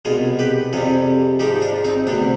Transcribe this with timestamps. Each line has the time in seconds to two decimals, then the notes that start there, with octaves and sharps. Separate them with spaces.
0.05 C2 B2 G#3 F4 G#4
0.39 G4 B4
0.73 F2 C3 G3 F4 G#4
1.39 G#2 F3 G#3 D#4 G4
1.62 D4 F4
1.84 C4 D#4
2.07 D2 C3 G3 B3 D4